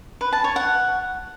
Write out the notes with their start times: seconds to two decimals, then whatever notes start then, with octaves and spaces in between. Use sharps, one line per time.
0.21 B4
0.32 A5
0.44 C#5
0.56 F#5